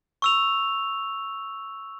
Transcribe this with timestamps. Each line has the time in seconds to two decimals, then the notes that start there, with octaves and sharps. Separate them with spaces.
0.22 C#6 E6 F7